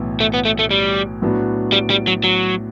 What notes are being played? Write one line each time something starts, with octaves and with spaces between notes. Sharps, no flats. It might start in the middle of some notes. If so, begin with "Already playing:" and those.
Already playing: B1 A2 E3 B3
A3
B3
A3
A3
G3
A2 F#3 B3 D4 F#4
G3
G3
F#3
F#3